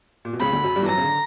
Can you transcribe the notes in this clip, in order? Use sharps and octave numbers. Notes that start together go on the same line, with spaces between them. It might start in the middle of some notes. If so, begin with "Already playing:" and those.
A#2
B2
C#2 C#3 B5
D2 D3
F#2 F#3
G2 G3
E3
F#2 F#3 A#5
C#3
D3